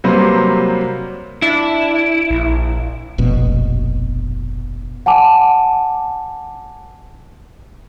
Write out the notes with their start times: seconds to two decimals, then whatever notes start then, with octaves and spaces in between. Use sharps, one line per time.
0.04 C3 F#3 G3 A#3 B4 C5
1.42 D4 E4
2.31 A#1
3.18 F1 A#1 B2
5.06 F#5 G#5 A5 D6